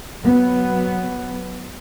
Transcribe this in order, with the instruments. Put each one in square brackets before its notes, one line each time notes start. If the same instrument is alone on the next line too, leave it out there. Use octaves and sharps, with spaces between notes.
[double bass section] F#3 B3